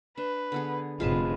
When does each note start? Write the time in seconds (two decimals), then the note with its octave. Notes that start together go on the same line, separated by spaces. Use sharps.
0.17 D4 B4
0.52 D3 B3 G#4
1.00 F1 G#3 F4 B4 A5